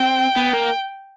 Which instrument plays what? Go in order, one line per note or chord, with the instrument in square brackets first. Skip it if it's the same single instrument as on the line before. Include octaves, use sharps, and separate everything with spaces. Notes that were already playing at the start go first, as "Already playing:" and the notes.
Already playing: [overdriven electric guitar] C4 [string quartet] G5
[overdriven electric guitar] B3
A#3